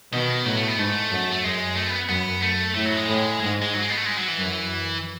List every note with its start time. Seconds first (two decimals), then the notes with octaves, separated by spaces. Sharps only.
0.13 B2 D#3
0.46 A2 F#3
0.57 A3
0.68 B3
0.78 G#2 A3
1.11 F#2
1.32 A3
1.43 F#2 G#3
1.76 A3
1.88 B3
2.09 F#2 B3
2.42 A3
2.75 A2 A3
2.86 F#3
2.97 G#3
3.08 A2
3.40 G#2 G#3
3.62 G#3
3.74 F#3
3.81 G#3
3.90 B3
3.98 A3
4.06 G#3
4.17 F#3
4.28 E3
4.38 F#2